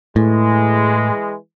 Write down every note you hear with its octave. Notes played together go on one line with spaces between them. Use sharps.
A2 E3 G#3